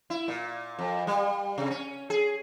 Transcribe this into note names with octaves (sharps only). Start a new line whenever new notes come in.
E4
A#2
F2
G3
C3
C#4
G#4